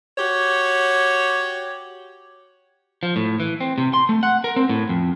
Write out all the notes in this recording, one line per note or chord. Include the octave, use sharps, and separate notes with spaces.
F#4 G4 C#5
F3
A2
E3
C4
C3
C6
A3
F#5
A#4
C4
A2
F2